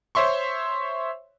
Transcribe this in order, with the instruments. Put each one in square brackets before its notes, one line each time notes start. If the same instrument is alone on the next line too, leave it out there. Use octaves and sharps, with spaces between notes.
[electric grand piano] C5 C#5 E5 C6 C#6